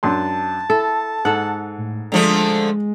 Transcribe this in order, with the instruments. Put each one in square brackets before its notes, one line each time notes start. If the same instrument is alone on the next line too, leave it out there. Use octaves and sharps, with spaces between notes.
[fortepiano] F#2 D4 C6 [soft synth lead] A5
[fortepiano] E4 [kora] A4
[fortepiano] G#2 [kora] A4 F#5
[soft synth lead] A2
[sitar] D3 F3 A3 [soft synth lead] G#3